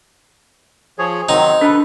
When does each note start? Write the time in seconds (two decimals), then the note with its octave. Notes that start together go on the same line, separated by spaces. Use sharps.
0.99 F3 G#4 C#5
1.29 D#3 F#3 C4 D#4
1.61 D4 A4 B4